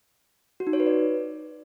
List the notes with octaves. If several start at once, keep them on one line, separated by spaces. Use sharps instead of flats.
F#4
D#4
C#5
B4
D5